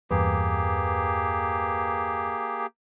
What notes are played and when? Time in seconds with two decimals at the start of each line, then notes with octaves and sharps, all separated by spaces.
0.11 E2 G2 A#3 G4 G#4 B4